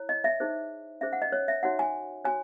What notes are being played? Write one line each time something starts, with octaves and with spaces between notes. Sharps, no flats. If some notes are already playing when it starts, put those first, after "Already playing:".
Already playing: E4 C#5
D#5
E5
D#4 G#4 C5
C#4 G#4 C5 E5
F#5
D#5
C#5
E5
D#4 F#4 C#5 F#5
G#5
F#4 C#5 G#5